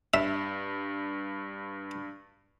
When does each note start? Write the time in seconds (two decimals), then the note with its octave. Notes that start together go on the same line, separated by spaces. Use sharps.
0.14 G2 E5